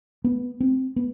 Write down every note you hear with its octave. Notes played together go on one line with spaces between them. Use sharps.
B3
C4
B3